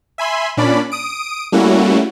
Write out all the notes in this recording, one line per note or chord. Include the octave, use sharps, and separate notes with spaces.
E5 G#5 B5 C6
A#2 C#4 D4 D5 B5
D#6 D7
G3 A3 A#3 C#4 E4 F#4